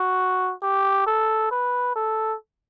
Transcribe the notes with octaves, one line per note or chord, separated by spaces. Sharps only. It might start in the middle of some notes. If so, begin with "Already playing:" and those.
Already playing: F#4
G4
A4
B4
A4